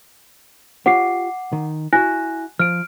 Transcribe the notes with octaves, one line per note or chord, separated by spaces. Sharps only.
F4 G4 C#5 F#5 D6 C7
D#3
E4 F#4 G#5 F#6 A#6
F3 F6 D7